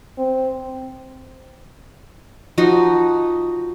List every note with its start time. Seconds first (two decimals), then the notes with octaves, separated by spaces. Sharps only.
0.17 C4
2.58 F3 D#4 F#4